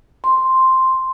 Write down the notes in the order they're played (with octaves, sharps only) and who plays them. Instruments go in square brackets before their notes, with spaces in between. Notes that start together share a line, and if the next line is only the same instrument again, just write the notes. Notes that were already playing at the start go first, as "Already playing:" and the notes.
[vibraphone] C6